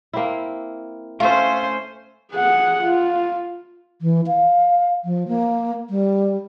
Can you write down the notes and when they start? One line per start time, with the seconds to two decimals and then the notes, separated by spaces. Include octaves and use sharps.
0.13 A#3 C4 E4
1.20 A3 C#4 F4 C5 E5
2.32 G#4 F#5
2.83 F4
4.02 E3
4.27 F5
5.05 F3
5.28 A#3
5.90 G3